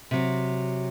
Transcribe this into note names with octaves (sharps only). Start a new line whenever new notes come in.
C3 F#3